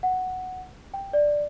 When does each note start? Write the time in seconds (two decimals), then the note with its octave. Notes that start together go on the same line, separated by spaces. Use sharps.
0.03 F#5
0.94 G5
1.13 D5